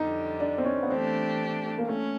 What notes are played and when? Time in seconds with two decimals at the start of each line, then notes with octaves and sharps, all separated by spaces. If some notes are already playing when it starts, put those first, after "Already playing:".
Already playing: F2 D3 G3 D#4
0.40 D4
0.58 C4
0.65 C#4
0.83 B3
0.90 E3 A3 C4 D4 G4
1.78 A#3
1.88 A3 C#4